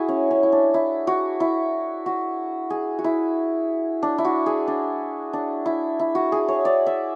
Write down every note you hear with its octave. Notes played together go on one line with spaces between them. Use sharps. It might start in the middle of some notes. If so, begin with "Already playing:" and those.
Already playing: E4 F#4 G#4
C#4
C#4
E4
D4
E4
F#4
E4
F#4
G#4
F#4
E4
D4
E4
F#4
G#4
D4
D4
E4
E4
F#4
G#4
C#5
D5
E5